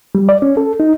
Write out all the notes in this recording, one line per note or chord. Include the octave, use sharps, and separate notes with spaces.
G3
D5
C#4
A4
D#4